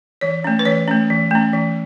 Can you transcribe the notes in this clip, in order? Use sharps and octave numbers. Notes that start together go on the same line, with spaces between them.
E3 C#5
A3 C#4
B4
E3 C#5
A3 C#4
E3
A3 C#4
E3